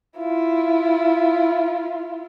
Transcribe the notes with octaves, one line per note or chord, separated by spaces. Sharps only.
E4 F4